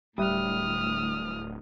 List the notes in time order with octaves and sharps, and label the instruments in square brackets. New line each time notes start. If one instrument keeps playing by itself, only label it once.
[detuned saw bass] D1 [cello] D2 A2 [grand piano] G3 E5 F#6 [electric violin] D#6 F6